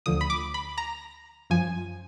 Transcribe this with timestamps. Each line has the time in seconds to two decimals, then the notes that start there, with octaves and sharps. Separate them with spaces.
0.06 D2 D3 F3 D#6
0.21 B5
0.30 D6
0.54 B5
0.78 A#5
1.50 F#2 F3 G#5